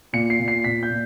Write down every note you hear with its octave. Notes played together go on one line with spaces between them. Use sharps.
A#2 C#7
C7
A#2
C7
A#2 B6
G6
A#2